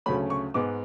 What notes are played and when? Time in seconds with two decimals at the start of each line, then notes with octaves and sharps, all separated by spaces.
0.06 D2 C#3 F#3 A3 C#4 B5
0.30 C#6
0.54 G#2 G#3 B3 D6